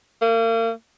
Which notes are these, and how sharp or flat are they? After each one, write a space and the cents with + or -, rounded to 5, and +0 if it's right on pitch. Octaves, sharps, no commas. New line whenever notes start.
A#3 -40